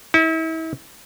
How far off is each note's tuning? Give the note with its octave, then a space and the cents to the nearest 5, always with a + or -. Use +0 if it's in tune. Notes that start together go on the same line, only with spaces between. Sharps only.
E4 -35